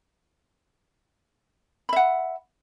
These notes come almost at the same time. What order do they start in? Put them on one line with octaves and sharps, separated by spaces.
B5 E5 F#5